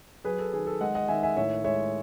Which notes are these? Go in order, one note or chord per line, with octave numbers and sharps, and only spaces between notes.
F#3 G#4 B4
A4
D#3 G#4
A4
G#3 D#5 F#5
D#5 F#5
D#3 E5 G#5
E5 G#5
A2 C#5 E5
G#3 C#5 E5